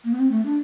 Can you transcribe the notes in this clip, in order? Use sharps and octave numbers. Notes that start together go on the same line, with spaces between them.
A#3
B3
C4
A3
D4